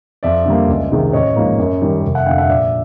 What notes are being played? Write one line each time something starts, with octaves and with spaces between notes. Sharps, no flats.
F2 D5 E5
D3 G3 A#3
C#2
C3 D#3 G#3
A1 C#5 D#5
G#2 F3 A#3
F#2
D#3 G3
F1
E5 F#5
F2 D3 F5 G5
E5 F#5
A#1 D5 E5